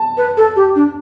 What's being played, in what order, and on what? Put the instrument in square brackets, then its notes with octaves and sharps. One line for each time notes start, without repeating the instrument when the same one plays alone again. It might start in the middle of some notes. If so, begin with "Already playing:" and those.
Already playing: [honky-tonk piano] A5
[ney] B4
A4
G4
D4